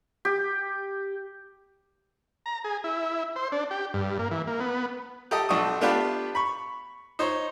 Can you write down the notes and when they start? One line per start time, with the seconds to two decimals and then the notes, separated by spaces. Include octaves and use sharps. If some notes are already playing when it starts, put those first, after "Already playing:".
0.25 G4
2.46 A#5
2.64 G#4
2.84 E4
3.36 C5
3.52 D4
3.71 G4
3.94 G2
4.19 A#3
4.31 E3
4.47 A#3
4.60 B3
5.31 G4 A4 D#5
5.49 B1 D4 C#6 D#6
5.81 A3 B3 D4 F4 G4 B4
6.35 B5 C#6
7.19 D#4 C5 C#5